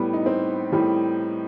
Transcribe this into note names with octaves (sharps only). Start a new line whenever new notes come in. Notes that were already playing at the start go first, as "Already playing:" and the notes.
Already playing: A2 G3 B3
D#4
C4
A2 G3